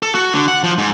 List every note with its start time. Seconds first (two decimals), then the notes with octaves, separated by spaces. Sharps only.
0.03 A4
0.15 F#4
0.33 D3
0.48 F#5
0.63 F3
0.78 G#2